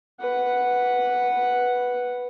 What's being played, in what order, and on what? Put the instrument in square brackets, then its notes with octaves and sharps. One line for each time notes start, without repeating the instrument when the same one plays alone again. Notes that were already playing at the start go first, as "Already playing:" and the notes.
[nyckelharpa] B4 F#5